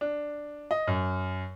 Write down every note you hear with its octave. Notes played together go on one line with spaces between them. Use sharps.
D4
D#5
F#2